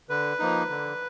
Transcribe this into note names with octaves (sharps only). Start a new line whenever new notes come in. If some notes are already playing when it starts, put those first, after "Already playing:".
D3 B4
F3 A#3 D#4
D3